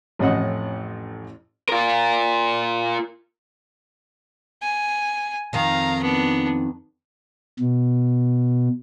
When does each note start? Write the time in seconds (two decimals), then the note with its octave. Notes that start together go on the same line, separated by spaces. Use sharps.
0.19 A1 F2 A2 C#4 D#5 F#5
1.69 F4 A#4
4.62 G#5
5.53 F2 D#3 F5 A#5
6.02 B3 D4
7.60 B2